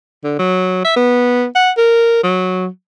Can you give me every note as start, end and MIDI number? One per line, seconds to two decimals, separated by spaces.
0.24 0.34 50
0.39 0.83 54
0.84 0.94 76
0.96 1.45 59
1.55 1.71 78
1.77 2.19 70
2.23 2.67 54